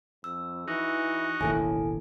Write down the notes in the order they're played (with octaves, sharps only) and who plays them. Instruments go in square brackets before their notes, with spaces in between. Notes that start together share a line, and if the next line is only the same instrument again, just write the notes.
[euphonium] F2 [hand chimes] E6
[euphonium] E3 [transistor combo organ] D#4 F#4
[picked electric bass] E1 A1 D#2 [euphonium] A2 [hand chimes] E4 A4 G#5